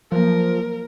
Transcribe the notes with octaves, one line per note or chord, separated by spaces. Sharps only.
F3 F#3 A#3 A#4